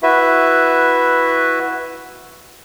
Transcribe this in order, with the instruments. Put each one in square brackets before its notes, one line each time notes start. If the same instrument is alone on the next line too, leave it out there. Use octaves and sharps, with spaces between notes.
[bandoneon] E4 F#4 B4 E5